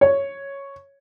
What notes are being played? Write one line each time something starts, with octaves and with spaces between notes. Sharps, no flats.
C#5